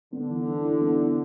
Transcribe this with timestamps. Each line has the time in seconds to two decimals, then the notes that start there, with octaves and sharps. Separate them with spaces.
0.12 D3 B3
0.29 E3
0.47 E3
0.64 E4
0.81 B3
0.99 E4